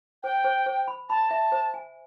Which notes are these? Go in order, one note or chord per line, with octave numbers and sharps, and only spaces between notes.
C5 G5
C5
C5
B5
A5 B5
E5
C5
G#5